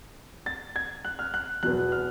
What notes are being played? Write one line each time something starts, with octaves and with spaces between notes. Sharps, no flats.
A6
G#6
F#6
F6
F#6
E2 B2 F#3 B3 F#6
F6